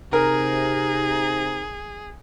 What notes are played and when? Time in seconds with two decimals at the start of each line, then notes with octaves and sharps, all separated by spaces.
0.13 C3 D#4 G#4 A#4